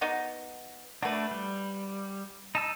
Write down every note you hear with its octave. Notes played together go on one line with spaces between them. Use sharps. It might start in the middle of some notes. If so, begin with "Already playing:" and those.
B3 D#4 F#4
A3 D4 F#4 B4
G3
D#4 A5 E6